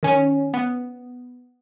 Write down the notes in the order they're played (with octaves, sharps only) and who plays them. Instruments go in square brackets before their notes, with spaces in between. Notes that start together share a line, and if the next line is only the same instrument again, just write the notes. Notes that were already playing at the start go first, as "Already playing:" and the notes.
[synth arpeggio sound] D#3 C#4
B3